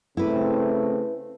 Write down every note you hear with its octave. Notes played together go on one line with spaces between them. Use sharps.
C#3 A3 C4 E4 B4